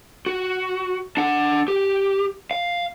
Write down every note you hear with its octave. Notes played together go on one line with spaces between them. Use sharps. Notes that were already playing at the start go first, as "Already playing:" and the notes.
F#4
D4 F#5
G4
F5